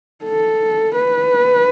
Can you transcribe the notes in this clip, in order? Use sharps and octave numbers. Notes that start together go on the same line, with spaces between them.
A4
B4